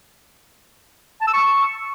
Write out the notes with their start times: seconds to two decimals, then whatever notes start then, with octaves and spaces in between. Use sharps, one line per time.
1.21 A5
1.27 E6
1.33 C#6